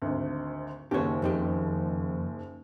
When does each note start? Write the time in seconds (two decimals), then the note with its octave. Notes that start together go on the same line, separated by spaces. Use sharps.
0.02 G#1 D2
0.91 F#1 D#2 G4 C#5
1.22 F2 D#3 G4